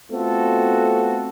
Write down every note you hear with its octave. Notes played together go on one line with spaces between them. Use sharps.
A3 B3 C4 F4 F#4 A4